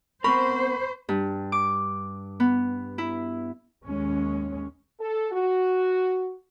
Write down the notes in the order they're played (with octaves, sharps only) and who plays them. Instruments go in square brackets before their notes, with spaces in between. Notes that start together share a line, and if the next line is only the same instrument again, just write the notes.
[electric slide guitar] B3 C4 A#4 [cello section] C5 [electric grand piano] B5 [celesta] C#6
[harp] G2
D6
B3
E4
[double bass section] D#2 G#3 C#4
[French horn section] A4
F#4